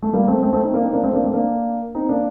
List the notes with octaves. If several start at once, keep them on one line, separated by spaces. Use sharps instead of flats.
A3
G3 A#3
A3 C4
A3 C4
A3 C4
C4 D#4
A#3 D4
C4 D#4
A#3 D4
A3 C4
A#3 D4
A3 C4
A#3 D4
C4 D#4
A#3 D4